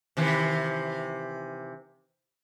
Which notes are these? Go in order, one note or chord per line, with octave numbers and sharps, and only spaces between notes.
C3 D#3 E3